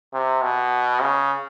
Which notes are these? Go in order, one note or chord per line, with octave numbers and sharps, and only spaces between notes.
C3
B2
C#3